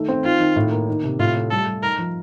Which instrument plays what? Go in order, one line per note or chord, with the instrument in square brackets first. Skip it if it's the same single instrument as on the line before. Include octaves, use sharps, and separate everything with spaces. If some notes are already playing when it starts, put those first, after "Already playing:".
Already playing: [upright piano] D#3 A3
C4
[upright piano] D#3 [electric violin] F4
[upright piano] D#3
A2
A#3
D#3
C3
[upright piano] A2 [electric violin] F4
[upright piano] A3
[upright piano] G3 [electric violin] A4
[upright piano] G3
[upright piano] D#4 [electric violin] A#4
[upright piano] F3